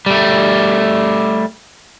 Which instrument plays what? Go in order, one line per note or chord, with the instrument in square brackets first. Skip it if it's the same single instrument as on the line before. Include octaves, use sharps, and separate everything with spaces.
[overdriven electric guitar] G3 A3